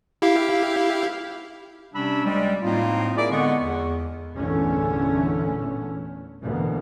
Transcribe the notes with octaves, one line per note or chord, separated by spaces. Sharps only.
E4 G4 F5
C3 G3 C#4 D4 B5 E6
D2 G3 G#3
A2 A#3 C4 D#4 F4
E4 G#4 A#4 D5
D3 G#3 B3 D#5 C#6
E2
G1 E2 A#2 D3 A3 C#4
D2 B2 E3 A#3